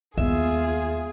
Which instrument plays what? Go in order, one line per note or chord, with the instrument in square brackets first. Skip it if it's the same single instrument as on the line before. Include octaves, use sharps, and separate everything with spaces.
[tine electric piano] D#2 [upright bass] G#3 B3 [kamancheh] F4 G#4 [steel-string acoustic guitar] E5